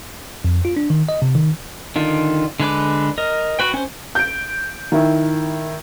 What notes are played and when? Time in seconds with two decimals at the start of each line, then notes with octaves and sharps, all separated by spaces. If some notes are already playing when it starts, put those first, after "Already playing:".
0.44 F2
0.65 F4
0.77 D4
0.90 D#3
1.09 D#5
1.22 C3
1.35 D#3
1.96 D3 D#3 F4
2.60 D3 G#3 B4 D6
3.18 A#4 D#5
3.59 F#4 B4 G5
3.74 C#4 C5
4.15 G6 D7
4.92 D#3 E4